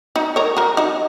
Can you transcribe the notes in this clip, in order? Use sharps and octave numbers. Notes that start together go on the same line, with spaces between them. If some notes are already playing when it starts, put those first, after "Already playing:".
D#4 F#4
A#4 C#5
F#4 A#4
D#4 F#4